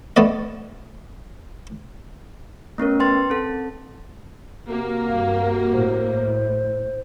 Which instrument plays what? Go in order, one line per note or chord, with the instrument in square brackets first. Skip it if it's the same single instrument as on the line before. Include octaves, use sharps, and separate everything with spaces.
[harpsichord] A3 B3 D5 D#5
[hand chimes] A3 B3 C#4 A#4
B4 G5 C6 A6
C4 A4
[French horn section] C3 F#4 [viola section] A#3
[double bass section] G2 [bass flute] F5
[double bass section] A2 [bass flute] C5